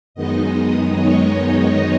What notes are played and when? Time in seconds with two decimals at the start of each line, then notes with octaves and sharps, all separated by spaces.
0.14 F#2 D#3 G#3 B3 D#4 D#5
0.54 D#5
0.94 C#5